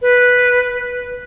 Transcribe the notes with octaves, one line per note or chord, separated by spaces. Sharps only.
B4